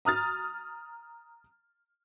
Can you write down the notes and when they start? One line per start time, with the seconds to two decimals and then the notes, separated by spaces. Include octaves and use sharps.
0.05 A#5 D#6 F6 A6